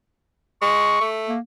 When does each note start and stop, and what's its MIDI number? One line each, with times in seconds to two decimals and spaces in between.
0.62 0.98 56
0.62 1.06 85
1.01 1.35 57
1.29 1.40 58